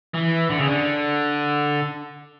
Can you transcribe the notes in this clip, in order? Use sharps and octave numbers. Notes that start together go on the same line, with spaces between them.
E3
D3
C#3
D3